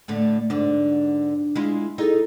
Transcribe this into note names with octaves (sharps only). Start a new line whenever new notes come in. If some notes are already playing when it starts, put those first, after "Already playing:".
A2 D3 A3
G#2 D3 D4
G#3 E4 F4
D#4 E4 G#4 A4